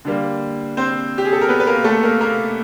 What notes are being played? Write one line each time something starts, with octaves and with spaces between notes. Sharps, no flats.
D3 G3 A#3
C4 C5
G4
G#4
A4
A#4
B3 B4
B4
A#3 A#4
A3 A4
A#3 A#4
A#3 A#4